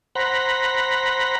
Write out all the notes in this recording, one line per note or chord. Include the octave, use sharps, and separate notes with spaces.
C5 F#5 A#5 B5